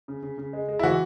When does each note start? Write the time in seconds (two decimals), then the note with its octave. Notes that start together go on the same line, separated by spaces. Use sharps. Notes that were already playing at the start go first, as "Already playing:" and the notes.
0.08 C#3
0.23 C#3
0.38 C#3
0.53 G#3
0.68 G#3
0.79 E4
0.83 E3 F#4